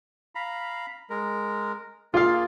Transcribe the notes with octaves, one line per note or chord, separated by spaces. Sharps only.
F5 A#5 B5
G#3 A#4
A#3 F4 G#4 D5 F5